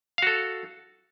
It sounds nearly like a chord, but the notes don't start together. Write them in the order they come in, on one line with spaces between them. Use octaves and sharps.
F5 F#4 A4